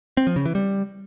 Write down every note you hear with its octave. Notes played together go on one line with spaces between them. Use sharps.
C4
F3
C#3
E3
G3